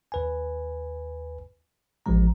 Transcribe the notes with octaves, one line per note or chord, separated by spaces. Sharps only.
D#2 B4 G#5
A1 D2 F3 G#3 A#5